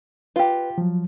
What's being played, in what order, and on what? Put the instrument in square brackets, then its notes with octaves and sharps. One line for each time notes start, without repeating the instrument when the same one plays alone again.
[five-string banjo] F4 G4 [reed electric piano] B4
[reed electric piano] F3 F#3